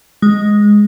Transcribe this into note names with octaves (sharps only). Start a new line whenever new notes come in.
G#3